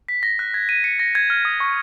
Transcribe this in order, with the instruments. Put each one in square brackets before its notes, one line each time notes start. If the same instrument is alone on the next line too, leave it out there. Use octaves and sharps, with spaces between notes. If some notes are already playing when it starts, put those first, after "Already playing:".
[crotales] B6
A#6
F#6
G#6
D#7
C#7
A#6
G#6
F6
D#6
C#6